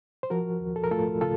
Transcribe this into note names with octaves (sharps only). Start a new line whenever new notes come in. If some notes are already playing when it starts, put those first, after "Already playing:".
C5
F3 F#4 A#4
D#2
A4
A#4
A3 F4 A4
C#3 F4 A4